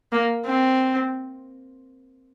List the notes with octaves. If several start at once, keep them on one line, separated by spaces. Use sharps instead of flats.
A#3
C4